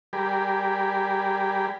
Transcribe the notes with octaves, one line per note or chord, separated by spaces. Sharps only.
G3 G4 G#4 A#4 D5 B5